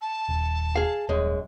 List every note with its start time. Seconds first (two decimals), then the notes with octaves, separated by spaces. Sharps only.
0.01 A5
0.29 D#1
0.76 G#4 F5
1.09 D#1 F#2 G#3